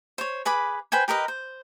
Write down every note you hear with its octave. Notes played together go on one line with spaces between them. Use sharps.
C5 C#5
G#4 B4 B5 D6
B4 C5 G5 G#5
G4 A#4 B4 D#5
C5